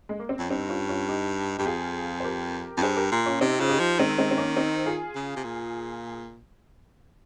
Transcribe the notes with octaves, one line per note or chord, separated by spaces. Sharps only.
G#3
A#3
C4
F2 C#4
G2 C4 D#4
C#4 F4
C#4 F4
D#4 G4
G2 G4
F2 F4 G#4
C5
G4 A#4
F2
G2 G#4 C5
G4 A#4
A#2
C#4 F4
C3 C4 D#4
C#3 F4
D#4 G4
F3
D#3 G#3 C4
G#3 C4
C4
A#3 C#4
C4 D#4
F4 G#4
C#3
C3
A#2